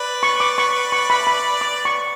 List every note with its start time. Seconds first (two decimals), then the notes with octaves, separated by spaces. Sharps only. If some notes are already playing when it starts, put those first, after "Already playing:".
Already playing: B4 D5
0.23 C#6
0.40 D6
0.58 C#6
0.92 C#6
1.10 B5
1.27 B5
1.61 D6
1.85 C#6